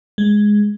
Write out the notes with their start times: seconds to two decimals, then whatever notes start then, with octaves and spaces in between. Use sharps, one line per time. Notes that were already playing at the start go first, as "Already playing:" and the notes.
0.18 G#3